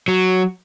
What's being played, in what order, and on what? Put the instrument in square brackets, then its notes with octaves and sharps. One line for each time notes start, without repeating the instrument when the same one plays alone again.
[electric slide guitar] F#3